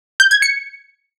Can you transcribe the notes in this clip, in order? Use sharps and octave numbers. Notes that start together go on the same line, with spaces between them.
G6
G#6
C#7